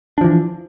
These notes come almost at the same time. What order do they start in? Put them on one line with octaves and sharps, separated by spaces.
D4 F3 E3